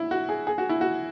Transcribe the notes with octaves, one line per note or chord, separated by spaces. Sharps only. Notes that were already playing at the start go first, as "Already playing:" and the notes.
Already playing: E4
F#4
G#4
G#4
F#4
E4
F#4